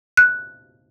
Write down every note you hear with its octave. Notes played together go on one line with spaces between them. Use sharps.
F#6